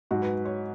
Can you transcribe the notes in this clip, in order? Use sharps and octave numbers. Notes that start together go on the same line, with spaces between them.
G#2 F#3 F#4
B4
C#5